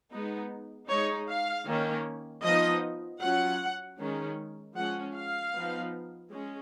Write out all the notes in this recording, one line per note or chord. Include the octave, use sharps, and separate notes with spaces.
G#3 B3 D#4
G#3 D#4 C#5
F5
D#3 A#3 C#4
F3 B3 D#4 D#5
F#3 C#4 F4 F#5
D#3 G#3 C#4
F3 G#3 C#4 F#5
F5
F3 B3 D#4
G#3 C#4